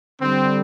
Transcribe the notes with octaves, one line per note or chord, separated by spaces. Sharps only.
D3 G3 C4